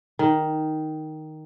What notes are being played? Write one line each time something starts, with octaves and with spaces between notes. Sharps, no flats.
D#3